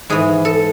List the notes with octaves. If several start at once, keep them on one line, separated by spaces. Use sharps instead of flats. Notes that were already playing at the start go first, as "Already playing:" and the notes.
G#2 E3 G#4
A4